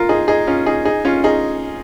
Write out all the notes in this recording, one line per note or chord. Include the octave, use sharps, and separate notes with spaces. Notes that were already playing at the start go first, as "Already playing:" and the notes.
Already playing: F4 A#4
D#4 G#4
D#4 G#4
C#4 F4
D#4 G#4
D#4 G#4
C#4 F4
D#4 G#4